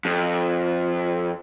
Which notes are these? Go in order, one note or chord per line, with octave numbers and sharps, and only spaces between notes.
F2